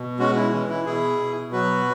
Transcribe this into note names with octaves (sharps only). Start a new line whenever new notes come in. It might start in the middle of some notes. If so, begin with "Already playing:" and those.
Already playing: B2
G#3 C#4 F#4
E4
E3 C#4
E4
B2 E4 G#4
B2
F#3 F#4 B4